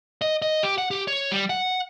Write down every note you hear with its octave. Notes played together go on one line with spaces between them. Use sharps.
D#5
D#5
G4
F#5
G4
C#5
G3
F#5